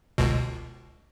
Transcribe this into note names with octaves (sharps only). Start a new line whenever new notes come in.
G1 C#2 B2